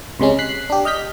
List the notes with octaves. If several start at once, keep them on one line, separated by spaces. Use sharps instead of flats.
C#2 C3 G#3 C#4
F#6 B6 C7
D4 G4
D#5 F6 G6 B6